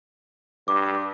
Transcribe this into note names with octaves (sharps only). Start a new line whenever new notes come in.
G2 D6